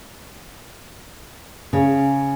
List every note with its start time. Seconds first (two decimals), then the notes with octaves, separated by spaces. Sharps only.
1.73 C#3